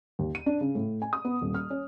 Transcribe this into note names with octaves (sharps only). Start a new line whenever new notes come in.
D#2
D#7
D4
C#3
A2
G#5
D#6
B3
D#1
F6
C#4